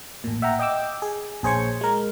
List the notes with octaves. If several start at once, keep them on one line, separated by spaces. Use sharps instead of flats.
A1 A#2
E5 F#5 G5 A#5
D#5 G5 D6 E6
G#4
A#1 G#4 C5 C#5 C#6
G#3 A#4